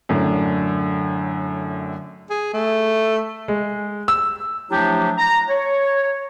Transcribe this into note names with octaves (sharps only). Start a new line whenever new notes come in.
F#2 A2 D3
G#4
A3
G#3
E6
F3 F#3 A3 D4 E4 G4
A#5
C#5